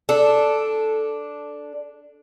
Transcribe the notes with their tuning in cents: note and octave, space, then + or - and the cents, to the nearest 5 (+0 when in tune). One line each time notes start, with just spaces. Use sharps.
D4 +0 A4 -5